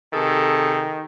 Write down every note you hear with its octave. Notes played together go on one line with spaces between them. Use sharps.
C3 D#3 G#4 A4